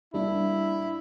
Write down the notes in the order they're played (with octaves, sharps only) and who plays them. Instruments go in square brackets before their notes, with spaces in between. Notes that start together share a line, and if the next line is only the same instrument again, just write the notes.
[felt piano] G3 A#3 D4 [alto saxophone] E4